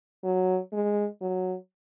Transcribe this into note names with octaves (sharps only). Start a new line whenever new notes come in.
F#3
G#3
F#3